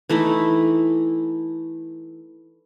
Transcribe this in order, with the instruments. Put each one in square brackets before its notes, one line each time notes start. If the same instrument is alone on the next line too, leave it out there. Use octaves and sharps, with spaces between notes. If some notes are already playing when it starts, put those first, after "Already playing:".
[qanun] E3 A3 D#4 E4